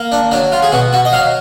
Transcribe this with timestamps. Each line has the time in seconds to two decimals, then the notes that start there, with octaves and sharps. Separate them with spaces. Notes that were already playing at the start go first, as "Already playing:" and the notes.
Already playing: A#3
0.12 D4
0.31 F#3 D4
0.52 F4
0.62 G#4
0.72 B2 F#4
0.93 F#4
1.05 D#5
1.13 F#3 F5